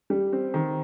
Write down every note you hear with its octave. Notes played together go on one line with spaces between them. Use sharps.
G3
C4
D#3